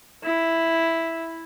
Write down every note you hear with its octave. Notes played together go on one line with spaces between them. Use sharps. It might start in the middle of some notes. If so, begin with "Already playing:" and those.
E4